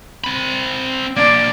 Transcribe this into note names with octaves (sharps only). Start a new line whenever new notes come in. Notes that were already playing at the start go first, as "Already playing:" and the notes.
C4 B5
A#3 D4 D5